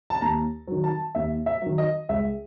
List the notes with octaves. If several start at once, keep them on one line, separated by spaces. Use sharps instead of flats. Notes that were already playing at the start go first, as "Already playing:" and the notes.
A5
D#2 A#5
D#3 F#3
A5
D#2 E5
E5
D#3 F#3
D#5
C#2 E5